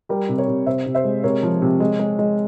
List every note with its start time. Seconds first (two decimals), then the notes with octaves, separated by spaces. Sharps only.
0.09 G3 G4 A#4
0.29 C3
0.38 A#4 C#5
0.48 C3
0.66 C3 C5 E5
0.86 C3
0.95 C5 E5
1.04 G#3
1.24 C3 A#4 C#5
1.43 F3
1.62 C3
1.80 G#3
2.00 G#3
2.19 G#3